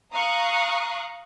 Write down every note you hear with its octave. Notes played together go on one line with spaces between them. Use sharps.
F5 A#5 C#6 D#6 F#6